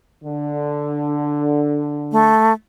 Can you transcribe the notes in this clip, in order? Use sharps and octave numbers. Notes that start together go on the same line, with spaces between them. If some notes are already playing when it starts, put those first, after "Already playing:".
D3
A3